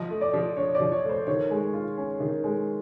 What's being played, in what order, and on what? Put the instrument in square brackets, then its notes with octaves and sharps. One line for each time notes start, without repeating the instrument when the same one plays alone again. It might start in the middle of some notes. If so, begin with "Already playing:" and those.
Already playing: [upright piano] F3 D#5
A3
D5
F3
D4 C#5
F3 D5
C#5
A3
C5
D#3 C#5
G#3
F4
C#4
D#3
G#3